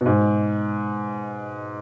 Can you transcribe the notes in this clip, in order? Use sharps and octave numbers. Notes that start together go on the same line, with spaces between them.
B2
G#2